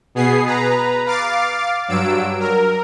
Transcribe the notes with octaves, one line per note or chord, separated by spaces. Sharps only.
B2 B3 G#4 C7
B4 A#5
F5 D6 A6 C7
G2 F#3 E6 D7
A#4